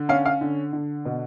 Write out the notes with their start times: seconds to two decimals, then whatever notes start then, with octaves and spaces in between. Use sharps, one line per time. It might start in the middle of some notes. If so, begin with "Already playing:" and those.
Already playing: D3
0.09 C#4 F5
0.26 F5
0.41 D3
0.73 D3
1.06 B2